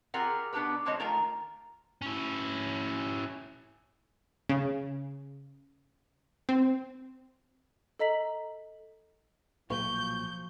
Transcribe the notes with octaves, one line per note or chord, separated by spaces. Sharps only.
C4 F4 G4 G#4 A#4 F#5
B2 B3 D4 D#4 G4 B4
D3 F3 G#3 C4 C#5 D#5
D#3 A3 F4 A#4 A#5
C#4 E4
C#3
C4
A4 D#5 A#5 B6 F#7
B1 A#2 F3 F#3 C#6 G6